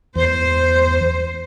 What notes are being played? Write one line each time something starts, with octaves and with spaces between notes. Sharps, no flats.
E2 C5